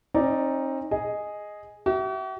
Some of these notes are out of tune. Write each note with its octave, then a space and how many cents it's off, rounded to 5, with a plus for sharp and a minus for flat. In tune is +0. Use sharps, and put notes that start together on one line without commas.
C4 +45 D#4 +0 D5 +0
G#4 +0 D#5 +0
F#4 +45 E5 +0